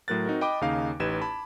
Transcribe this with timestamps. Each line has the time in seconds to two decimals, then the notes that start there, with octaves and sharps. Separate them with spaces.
0.08 A2 F#3 A#4 F#6 A6
0.26 C4 D#4 F#4 A#4
0.41 D#5 G5 B5 D6
0.61 D#2 C#3 D#4 F5 D6
1.00 A1 D#4 G4 B4 G#6 E7
1.22 A5 B5